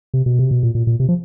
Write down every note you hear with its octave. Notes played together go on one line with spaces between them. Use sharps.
C3
B2
C3
B2
A#2
A#2
A#2
C3
F3